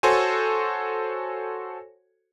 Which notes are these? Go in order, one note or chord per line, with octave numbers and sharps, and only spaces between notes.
F#4 A4 C5 C#5 G#5